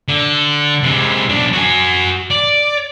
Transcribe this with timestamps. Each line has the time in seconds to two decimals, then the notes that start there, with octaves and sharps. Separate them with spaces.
0.08 D3
0.83 C3 G#3
1.29 B1 D4
1.53 F#4 G#5
2.31 D5